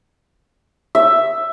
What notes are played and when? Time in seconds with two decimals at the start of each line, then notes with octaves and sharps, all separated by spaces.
0.95 E5